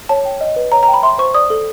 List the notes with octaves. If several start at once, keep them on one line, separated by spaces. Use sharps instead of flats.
C#5 A5
G5
D#5
B4
C#5 A#5
A#5
G5
B5
E5 C6
C5 C#6
D5 D#6
A4